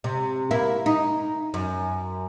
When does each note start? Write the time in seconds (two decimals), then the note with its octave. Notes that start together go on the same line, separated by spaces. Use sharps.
0.04 C3
0.51 A#3 E4
0.86 D#4
1.54 F#2